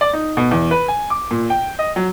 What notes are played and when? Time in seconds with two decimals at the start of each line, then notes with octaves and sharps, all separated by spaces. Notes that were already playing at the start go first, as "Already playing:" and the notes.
0.01 D5
0.13 D#4
0.37 B2
0.51 E2
0.71 B4
0.88 G#5
1.10 D6
1.31 A#2
1.50 G5
1.79 D#5
1.96 F#3